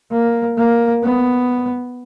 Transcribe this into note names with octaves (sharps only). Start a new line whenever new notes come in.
A#3
A#3
B3